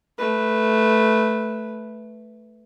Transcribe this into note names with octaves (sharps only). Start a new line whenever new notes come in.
A3 B4